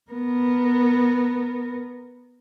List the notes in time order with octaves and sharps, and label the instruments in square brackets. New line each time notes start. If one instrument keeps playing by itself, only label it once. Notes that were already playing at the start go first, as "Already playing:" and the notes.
[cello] B3 A#4